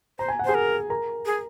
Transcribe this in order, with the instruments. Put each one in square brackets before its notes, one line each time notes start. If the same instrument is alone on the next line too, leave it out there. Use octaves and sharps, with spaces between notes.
[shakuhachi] C5 [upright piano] A#5
[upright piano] G#5
F#5
[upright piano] G#4 G#5 [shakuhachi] C5
[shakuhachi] A#4
[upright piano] A#4 A#5
[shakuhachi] G#4